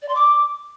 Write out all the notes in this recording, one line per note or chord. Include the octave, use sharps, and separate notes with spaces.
D5
C6
D6